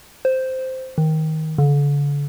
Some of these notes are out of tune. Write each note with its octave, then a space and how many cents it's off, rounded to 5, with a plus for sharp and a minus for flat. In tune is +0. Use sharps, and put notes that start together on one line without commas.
C5 -5
D#3 +15
D3 -40